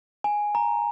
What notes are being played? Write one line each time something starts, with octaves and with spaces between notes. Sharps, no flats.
G#5
A#5